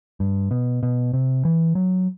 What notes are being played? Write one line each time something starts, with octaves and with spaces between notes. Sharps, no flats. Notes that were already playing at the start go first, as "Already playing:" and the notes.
G2
B2
B2
C3
E3
F#3